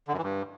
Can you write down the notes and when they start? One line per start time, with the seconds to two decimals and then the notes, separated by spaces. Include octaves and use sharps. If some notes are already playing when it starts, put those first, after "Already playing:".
0.08 D3
0.13 F#2
0.18 E3
0.23 G2